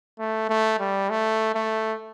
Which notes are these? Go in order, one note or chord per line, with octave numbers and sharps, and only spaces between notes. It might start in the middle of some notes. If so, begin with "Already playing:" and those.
A3
A3
G3
A3
A3